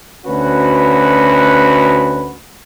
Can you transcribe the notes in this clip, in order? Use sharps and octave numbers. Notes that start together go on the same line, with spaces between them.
D2 C#4 F#4 B4